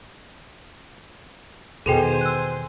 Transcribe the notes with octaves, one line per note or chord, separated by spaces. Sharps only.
E2 B2 D#3 G#4 A4 C5 G5 G#5
E6 F#6